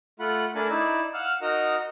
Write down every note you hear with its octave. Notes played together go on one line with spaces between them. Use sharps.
A3 F4 F#5 B5
A3 D4 A#4 G#5 A5 B5
D#4 E4 D5 E6
F5 F#5 E6 F6
D#4 F#4 A#4 D#5 A#5